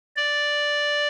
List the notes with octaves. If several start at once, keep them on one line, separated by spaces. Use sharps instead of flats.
D5